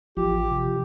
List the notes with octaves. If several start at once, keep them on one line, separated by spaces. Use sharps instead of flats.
A1 F3 G4
C3